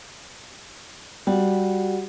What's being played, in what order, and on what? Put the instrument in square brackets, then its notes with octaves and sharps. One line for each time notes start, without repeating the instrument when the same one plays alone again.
[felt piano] G3 [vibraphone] F#4 G4 F#5